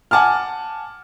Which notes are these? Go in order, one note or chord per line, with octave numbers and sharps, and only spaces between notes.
F#5 G#5 A5 D6 F6